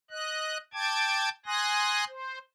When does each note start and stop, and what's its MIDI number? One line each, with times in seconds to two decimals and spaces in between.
0.11 0.58 75
0.11 0.58 90
0.73 1.29 79
0.73 1.29 81
0.73 1.29 86
0.73 1.29 92
1.46 2.04 80
1.46 2.04 84
1.46 2.04 87
1.46 2.04 90
1.46 2.04 94
2.08 2.38 72